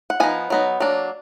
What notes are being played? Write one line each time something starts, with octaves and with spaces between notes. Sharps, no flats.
F#5
F3 B3 D#4 G#5
F#3 B3 D#4
F#3 A#3 D4